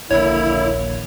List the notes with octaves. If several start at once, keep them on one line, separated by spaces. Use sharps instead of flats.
D#1 A#1 D3 A#3 E4 C#5